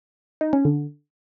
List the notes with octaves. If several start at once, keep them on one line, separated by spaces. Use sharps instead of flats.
D#4
C#4
D3